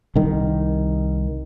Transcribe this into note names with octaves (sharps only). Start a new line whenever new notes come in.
C2 D#3